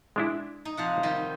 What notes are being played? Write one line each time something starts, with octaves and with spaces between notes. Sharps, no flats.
G#3 D4 E4
D#4
C3 F3 F#5
D#3 G3 D#5